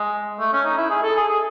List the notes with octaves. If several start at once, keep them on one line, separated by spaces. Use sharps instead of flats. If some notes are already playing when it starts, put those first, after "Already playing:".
Already playing: G#3
A3
C#4
D#4
E4
G#4
A4
G#4
G#4